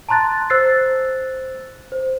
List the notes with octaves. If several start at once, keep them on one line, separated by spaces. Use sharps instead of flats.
A5 A#5 C6 F#6 A6
C5 E6 F#6 A6 C7
C5